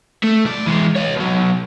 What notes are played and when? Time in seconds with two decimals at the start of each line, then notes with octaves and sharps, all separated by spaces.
0.23 A3
0.45 B1 D5
0.66 E3 G#3
0.95 C#5 D#5
1.15 B2 F#3